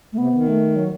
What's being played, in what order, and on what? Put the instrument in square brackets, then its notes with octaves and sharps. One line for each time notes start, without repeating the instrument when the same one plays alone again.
[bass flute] A3
[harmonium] C3 [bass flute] B3
[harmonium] D#3
[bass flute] A3
F#3